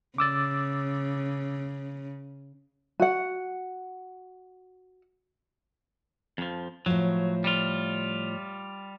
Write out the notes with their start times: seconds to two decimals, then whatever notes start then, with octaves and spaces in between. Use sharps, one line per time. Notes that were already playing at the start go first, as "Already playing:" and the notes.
0.18 C#3 D6 E6 A6
3.00 F#4 F#5
6.38 F2 F3
6.86 A2 F3 F#3
7.44 G3 F4